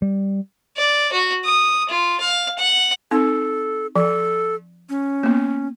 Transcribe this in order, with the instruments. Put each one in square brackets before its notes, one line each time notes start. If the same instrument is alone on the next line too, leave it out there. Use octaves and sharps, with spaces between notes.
[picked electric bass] G3
[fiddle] D5
F#4
D#6
F4
F5
F#5
[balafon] C4 D#4 [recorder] A4
[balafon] F3 [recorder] A4
[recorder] C#4
[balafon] A#3 B3